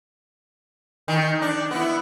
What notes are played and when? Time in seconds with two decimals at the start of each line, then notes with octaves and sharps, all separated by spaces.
1.08 D#3
1.42 D4
1.71 B3 E4